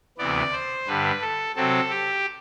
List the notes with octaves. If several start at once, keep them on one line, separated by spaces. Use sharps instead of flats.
D2 C3 E3 B3 D5
C5
G2 D3 G3 B4
A4
C3 F#3 C4 A4
G4